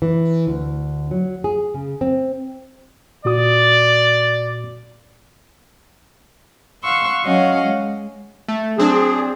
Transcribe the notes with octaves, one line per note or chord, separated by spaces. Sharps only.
E3
D2
F#3
G#4
C#3
C4
A#2 F#4 D5 D#6
F5 F#5 C6 C#6 E6
F#3 C#4 C#5 D#5 F5 F#5
G#3
A3
F#3 C4 D4 G#4